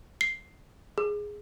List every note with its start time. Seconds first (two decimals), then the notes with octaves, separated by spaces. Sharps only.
0.21 C7
0.98 G#4